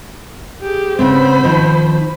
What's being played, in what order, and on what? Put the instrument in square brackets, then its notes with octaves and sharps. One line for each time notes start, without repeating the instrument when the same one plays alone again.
[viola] G4 G#4
[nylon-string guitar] C#3 B3 C4 [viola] C5 B5
[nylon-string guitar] D#3 F3